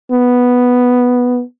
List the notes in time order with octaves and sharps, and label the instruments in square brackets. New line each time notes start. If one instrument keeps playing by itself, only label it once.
[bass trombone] B3